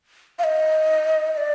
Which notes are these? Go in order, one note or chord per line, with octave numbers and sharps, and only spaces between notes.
F5
D#5
D#5
D5